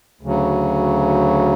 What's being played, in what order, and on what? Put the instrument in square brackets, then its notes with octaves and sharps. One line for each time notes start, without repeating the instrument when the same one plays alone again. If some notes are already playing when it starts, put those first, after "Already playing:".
[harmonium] D2 C#3 F#3